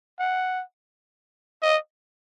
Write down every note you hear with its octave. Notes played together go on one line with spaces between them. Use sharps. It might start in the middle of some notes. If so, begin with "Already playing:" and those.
F#5
D#5